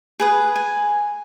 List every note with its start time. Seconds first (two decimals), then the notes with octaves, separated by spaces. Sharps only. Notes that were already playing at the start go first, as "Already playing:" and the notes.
0.20 G#4 B4 D#6
0.56 G#5